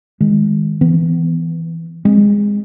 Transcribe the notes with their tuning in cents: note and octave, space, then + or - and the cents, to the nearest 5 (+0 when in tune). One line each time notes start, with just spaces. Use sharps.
D#3 +30 G#3 -5
E3 +0 B3 +25
G#3 -20 C4 +0